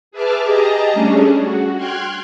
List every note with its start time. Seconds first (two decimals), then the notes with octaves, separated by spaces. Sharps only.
0.11 G#4 B4 E5 A5 D6 F6
0.44 G4 G#4 D#5 A5 A#5
0.93 G3 A3 C#4 D4 G#4
1.38 F#4
1.76 G5 C6 F6 F#6 G#6